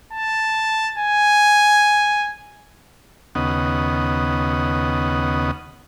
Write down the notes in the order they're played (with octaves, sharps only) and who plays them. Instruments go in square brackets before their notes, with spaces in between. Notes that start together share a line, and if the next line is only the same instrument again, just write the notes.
[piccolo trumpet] A5
G#5
[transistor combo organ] D#2 C#3 B3 D#5 F#5